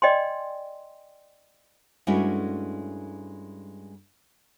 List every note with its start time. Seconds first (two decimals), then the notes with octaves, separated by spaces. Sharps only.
0.02 D5 D#5 G5 G#5 C6
2.07 G2 G#3 A3 C#4 E4 F#4